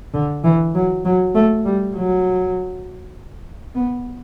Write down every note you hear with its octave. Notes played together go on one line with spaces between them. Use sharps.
D3
E3
F#3
F#3
A3
G3
F#3
B3